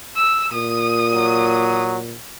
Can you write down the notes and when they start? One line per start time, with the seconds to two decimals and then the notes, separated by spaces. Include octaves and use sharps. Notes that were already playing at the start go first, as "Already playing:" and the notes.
0.16 E6
0.53 A#2 D#6
1.12 F#3